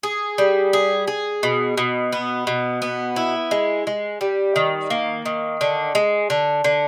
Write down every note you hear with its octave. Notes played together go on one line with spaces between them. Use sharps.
G#4
G3
G#4
G#4
B2
B2
B3
B2
B3
E4
G#3
G#3
G3
D#3
A#3
D#3
D3
G#3
D3
D3